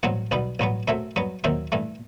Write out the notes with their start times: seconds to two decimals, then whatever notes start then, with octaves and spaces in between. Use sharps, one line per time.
0.03 A1 G2 F#3 C4 F#5
0.31 B1 B2 G3 B3
0.59 A1 G2 F#3 B3
0.88 F#2 F#3 A3 C4 E5
1.16 G2 F#3 B3
1.44 D#2 D#3 F#3 C4 E5
1.72 G2 E3 A3